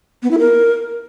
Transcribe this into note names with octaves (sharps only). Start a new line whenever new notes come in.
B3
E4
A#4